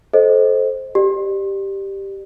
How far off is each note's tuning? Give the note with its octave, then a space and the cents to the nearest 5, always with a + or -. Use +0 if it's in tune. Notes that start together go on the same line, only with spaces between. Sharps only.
A4 -20 C5 +0 D#5 +0
G4 +0 D5 +30